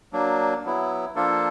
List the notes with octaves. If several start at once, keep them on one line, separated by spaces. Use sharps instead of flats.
F#3 A#3 D4
F#3 B3 E4
F3 A#3 D4 F4 A4